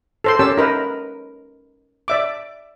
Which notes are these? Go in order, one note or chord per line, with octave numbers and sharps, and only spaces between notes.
A4 C5 C6
C#4 G4 A#4 C#5 A5 E6
D#4 A#4 B4
D5 E5 D6